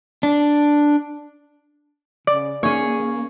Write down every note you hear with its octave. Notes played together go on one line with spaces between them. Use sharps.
D4
C#3 D5
A#3 C#4 G#4 C#5